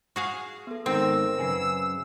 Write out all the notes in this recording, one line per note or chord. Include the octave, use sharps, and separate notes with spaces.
F#4 G#4 F5
B3 A4
G#2 D#3 C4 A#4 E6 A#6
F#2 A#2 C#3 B4 G#5 C7